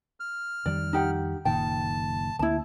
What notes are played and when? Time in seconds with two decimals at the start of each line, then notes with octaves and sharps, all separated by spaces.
0.20 F6
0.66 F2 D#3 G3 D5
0.93 D#4 G4 F#5
1.45 F#1 A#2 D#3 G5 A5
2.39 D2 A#3 E4 A5